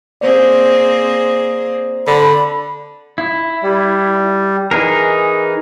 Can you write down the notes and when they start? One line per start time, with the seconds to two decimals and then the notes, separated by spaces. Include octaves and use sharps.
0.21 A#3 C4 G#4 C5 D5
2.07 D3 B5
3.18 E4
3.63 G3
4.71 E3 D#4 G#4 A#4